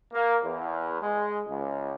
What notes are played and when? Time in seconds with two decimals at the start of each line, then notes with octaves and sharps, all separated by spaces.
0.13 A#3
0.43 E2
1.01 G#3
1.48 C#2